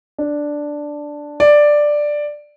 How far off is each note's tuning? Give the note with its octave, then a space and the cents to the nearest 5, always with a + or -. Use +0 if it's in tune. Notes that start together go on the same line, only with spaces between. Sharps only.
D4 +0
D5 +5